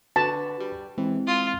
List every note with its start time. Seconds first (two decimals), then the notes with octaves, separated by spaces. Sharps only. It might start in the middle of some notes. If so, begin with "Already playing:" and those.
0.16 D3 D4 F#4 B4 A5
0.60 G3
0.98 E3 G#3 C4 E4
1.27 F4 D#6 C7 D#7